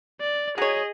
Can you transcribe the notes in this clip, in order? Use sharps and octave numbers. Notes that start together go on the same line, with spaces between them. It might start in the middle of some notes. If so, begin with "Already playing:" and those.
D5
F#3 G#4 C#5 D#5